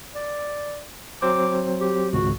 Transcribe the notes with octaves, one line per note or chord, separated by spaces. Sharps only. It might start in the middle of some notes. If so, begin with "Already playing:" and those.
D5
F#3 C4 C5 D6
G4
G#1 C#2 F#4